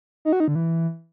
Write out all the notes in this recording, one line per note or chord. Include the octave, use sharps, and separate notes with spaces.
D#4
F#4
D#4
D3
E3